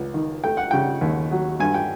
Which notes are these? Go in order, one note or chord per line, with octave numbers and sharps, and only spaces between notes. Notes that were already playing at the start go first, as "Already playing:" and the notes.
Already playing: C#2
D#3
A3 G5
F#5
C#3 G5
D#2
F#3
G2 G#5
G5